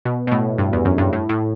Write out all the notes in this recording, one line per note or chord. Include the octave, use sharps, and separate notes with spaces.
B2
B2
A2
G2
E2
F#2
G2
A2
A2